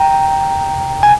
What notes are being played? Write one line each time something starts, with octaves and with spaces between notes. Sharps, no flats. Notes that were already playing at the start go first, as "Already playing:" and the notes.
Already playing: G5 A#5
G#5